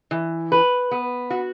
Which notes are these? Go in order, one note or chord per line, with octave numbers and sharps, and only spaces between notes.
E3
B4
B3
F#4